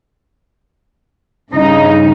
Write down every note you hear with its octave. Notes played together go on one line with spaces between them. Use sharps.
G2 C#3 D#4